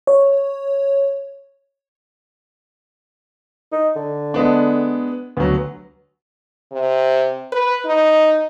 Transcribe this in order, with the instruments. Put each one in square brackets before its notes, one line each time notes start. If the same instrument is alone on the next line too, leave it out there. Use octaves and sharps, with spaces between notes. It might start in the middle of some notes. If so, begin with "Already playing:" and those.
[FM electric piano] C#5
[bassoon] D#4
D3
[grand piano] G#3 B3 D4
[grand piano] D2 F#3 [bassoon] B3
[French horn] C3
B4
D#4